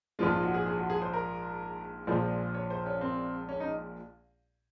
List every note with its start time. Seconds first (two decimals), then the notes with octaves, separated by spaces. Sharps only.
0.19 A#1 G#2 F3 G#3 F4
0.30 F4
0.43 F#4
0.54 G#4
0.66 G#4
0.78 F#4
0.90 G#4
1.02 C5
1.13 A#4
2.07 A#1 A#2 F3 G#3 C5
2.54 C#5
2.70 C5
2.86 C#4
3.01 C4
3.49 C#4
3.60 D#4